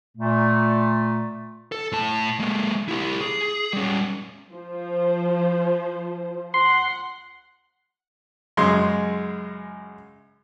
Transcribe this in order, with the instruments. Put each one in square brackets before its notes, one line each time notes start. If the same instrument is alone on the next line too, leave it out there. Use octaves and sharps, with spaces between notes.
[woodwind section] A#2 A3
[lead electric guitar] A4
A2 A5
G#3 A#3
E4 G4
G#4
G3 C#4
[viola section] F3 C5
[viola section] F#5 [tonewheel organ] C6
[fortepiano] F#2 C#3 G#3 C6